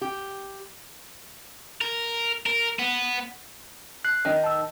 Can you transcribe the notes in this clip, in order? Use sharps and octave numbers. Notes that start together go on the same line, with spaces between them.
G4
A#4
A#4
B3
F#6 C7
D#3 D#4
A5 E6